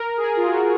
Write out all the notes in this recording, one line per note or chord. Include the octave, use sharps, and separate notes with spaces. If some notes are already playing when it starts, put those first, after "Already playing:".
Already playing: A#4
G#4
F4
F#4